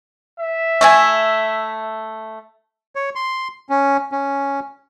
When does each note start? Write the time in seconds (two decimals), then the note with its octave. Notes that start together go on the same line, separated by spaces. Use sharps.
0.39 E5
0.81 A3 E4 G#5
2.95 C#5
3.15 C6
3.70 C#4
4.12 C#4